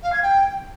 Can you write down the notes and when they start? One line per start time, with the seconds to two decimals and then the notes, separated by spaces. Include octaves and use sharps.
0.02 F5
0.12 G#6
0.22 G5